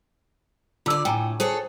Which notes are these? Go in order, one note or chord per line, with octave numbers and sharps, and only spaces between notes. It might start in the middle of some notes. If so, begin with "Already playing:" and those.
D3 F4 D5 E6
A2 G5 G#5 A#5
G#4 A4 C5 C#5